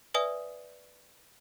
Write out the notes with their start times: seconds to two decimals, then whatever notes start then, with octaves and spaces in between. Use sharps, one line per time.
0.14 B4 D5 E5 G#5 D#6